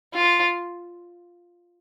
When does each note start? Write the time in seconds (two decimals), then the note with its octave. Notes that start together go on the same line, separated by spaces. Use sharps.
0.14 F4